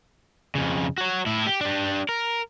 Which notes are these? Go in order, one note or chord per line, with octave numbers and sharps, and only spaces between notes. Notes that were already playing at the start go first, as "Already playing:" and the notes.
F2 C#3
F#4 C#5
A2 E4
G4
D4 G4
A#4